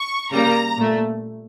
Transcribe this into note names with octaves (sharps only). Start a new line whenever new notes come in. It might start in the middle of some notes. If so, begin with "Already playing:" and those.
Already playing: C#6
C#3 G3 A#3 A#5
A#2 A3